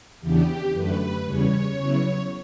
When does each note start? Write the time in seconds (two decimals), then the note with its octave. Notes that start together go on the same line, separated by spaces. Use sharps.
0.21 E2 C#3 E3 B3 D4 G4
0.73 F#2 D3 A3 B4
1.25 E2 C#3 G3 C#4 C#5
1.77 C#3 F#3 B3 E4